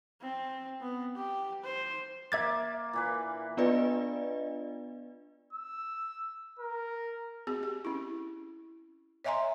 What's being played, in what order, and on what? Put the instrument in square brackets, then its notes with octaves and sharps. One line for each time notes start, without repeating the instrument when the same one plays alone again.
[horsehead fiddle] C4
B3
G4
C5
[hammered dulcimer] A#3 [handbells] E5 G#6 A6
[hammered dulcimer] A#2 E3 B4
[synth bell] B3 D4 F4 B4 D5 D#5
[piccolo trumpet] E6
A#4
[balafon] C4 F#4 G#4
G4
C#4 E4
C#5 D#5 E5 G#5 A#5 C6